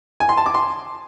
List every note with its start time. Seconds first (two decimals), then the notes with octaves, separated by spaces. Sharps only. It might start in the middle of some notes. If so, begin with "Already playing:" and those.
0.20 G#5
0.29 C6
0.37 A5
0.46 D6
0.54 C6